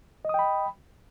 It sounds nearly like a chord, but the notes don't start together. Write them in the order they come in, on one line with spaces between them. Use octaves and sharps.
D#5 D#6 G5 B5